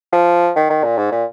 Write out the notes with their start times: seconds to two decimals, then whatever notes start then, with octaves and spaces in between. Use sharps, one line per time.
0.12 F3
0.56 D#3
0.70 D#3
0.84 A#2
0.98 G#2
1.12 A#2